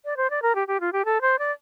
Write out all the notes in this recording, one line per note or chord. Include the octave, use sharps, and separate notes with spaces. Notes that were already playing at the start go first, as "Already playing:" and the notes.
D5
C5
D5
A#4
G4
G4
F4
G4
A4
C5
D5